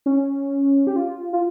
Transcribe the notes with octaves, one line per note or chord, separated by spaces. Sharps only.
C#4
G4
F4
F4